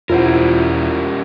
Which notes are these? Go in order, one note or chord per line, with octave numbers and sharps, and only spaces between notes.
E1 C#4 E4 F4 G4 A#4 C5 F#5